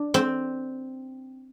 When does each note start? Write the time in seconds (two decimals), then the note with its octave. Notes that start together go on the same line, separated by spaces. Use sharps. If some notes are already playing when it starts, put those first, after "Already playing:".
Already playing: D4
0.14 C4